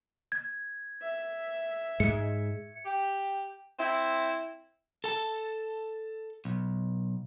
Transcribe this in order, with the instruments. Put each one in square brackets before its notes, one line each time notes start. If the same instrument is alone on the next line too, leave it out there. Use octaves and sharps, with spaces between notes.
[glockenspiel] G#6
[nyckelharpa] E5
[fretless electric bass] G#2 G#3 [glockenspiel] C#7
[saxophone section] G4
C4 E4
[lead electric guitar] A4 A5
B1